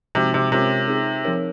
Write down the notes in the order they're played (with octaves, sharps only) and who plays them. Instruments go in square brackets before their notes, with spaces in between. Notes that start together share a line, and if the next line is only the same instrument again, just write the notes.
[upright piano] C3 [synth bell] F3 G#3 D#4 F#4
[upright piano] C3
[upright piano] C3 [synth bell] G#3 C#4 F4 A#4 C#5
[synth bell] C4 D#4 G#4
F3 C4 D#4 A#4 C#5